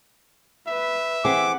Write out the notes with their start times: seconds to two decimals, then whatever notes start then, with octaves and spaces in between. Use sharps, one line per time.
0.67 B4 E5
1.25 E3 C4 G#4 F#5 D6